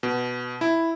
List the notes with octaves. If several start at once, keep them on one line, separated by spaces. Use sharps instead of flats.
B2
E4